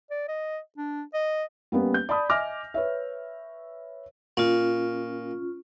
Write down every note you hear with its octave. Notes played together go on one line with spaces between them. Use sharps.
D5
D#5
D4
D#5
G3 A#3 B3 C#4
G6
D5 A5 B5 D#6
D#5 E5 G#5 D6 F6 A#6
B4 C#5 E5
A#2 C#4 F4